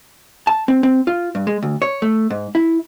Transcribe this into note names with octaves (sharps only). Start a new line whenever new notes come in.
A5
C4
C4
F4
G2
G#3
D2
C#5
A3
G#2
E4